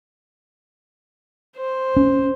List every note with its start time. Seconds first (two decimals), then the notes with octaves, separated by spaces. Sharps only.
1.57 C5
1.97 C#4